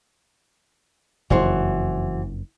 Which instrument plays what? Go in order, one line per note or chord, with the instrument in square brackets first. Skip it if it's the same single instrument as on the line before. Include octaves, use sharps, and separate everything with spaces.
[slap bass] F#1 F2 [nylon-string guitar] E3 F#4 C5